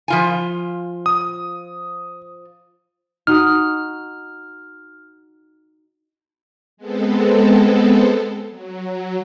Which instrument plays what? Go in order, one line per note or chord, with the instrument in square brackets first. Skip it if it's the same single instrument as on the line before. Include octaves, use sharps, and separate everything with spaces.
[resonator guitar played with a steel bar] F3 F4 G#5
[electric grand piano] D#6
[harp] D#4 F#4 D#6 [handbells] F6
[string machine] G#3 B3 C4 A4
F#3